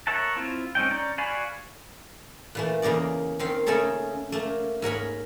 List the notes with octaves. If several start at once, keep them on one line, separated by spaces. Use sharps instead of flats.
A#4 C#5 E5 F#5 A5
C4 E4 F4
G#3 C4 C#4 D#4 G5
C#4 D5 A#5 G6
F#4 D5 F5 G#5 B5
A#2 E3 A3
E2 C#3 A#3 D#4 D5
D#3 C4 F5
C#3 A3 C#4 D#4 A4 C#5
A3 A#3
G#2 A#4 C#5 B5